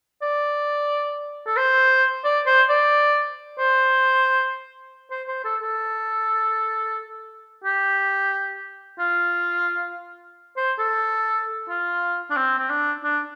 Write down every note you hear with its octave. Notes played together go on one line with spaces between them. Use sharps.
D5
A4
C5
D5
C5
D5
C5
C5
C5
A4
A4
G4
F4
C5
A4
F4
D4
C4
C4
D4
D4